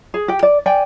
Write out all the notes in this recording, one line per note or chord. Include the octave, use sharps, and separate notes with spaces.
G#4
G4 G5
D5
D5 G5 G#5